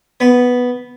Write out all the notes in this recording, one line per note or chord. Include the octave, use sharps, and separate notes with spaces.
B3